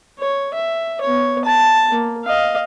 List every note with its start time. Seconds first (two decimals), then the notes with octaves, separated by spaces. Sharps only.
0.19 C#5
0.55 E5
1.01 B3 C#5
1.45 A5
1.91 A#3
2.25 D#5 F5